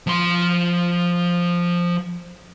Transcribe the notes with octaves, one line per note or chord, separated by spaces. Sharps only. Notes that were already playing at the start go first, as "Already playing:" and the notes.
F3 C6